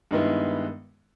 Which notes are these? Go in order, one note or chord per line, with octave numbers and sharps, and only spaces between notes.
G2 D#3 G#3 B3 E4